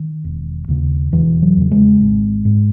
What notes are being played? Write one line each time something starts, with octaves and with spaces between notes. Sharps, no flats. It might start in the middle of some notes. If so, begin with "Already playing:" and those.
Already playing: D#3
E1
D#2 C#3
E1 E3
F#3
E2 C#3
G#3
G#1
G#2